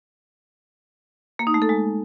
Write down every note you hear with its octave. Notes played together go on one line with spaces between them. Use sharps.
A#3
D#4
A3
A4
G#3